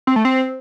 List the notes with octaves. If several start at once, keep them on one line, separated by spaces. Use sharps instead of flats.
C4
A3
C4